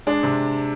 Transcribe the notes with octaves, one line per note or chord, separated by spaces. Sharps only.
G#3 D4
C3